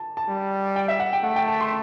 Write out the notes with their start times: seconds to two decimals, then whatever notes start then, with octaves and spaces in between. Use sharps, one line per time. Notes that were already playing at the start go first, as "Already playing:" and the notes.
Already playing: A5
0.17 A5
0.29 G3
0.76 G5
0.88 E5
1.00 F#5
1.13 G5
1.24 A3 F#5
1.36 G5
1.48 A5
1.61 C6